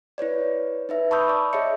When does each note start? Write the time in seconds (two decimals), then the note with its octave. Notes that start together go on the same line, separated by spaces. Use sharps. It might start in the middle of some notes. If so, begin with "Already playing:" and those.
0.18 E4 B4 C#5 D5
0.89 D#4 B4 E5
1.11 A5 B5 C#6 D#6 E6 G6
1.28 D5 D6
1.53 G#4 C#5 D#5 E5 C#7